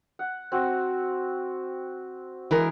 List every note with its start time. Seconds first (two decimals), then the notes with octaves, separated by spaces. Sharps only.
0.19 F#5
0.52 C4 F#4
2.51 E3 G#3 A#4